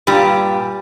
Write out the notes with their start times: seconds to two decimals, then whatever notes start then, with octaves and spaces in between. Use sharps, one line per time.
0.07 G2 A#2 G3 G4